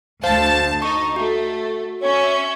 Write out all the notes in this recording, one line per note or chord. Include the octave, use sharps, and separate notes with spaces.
D2 C5 F5 A5
D#4 C#6
A3 F#4
C#4 C#5 E5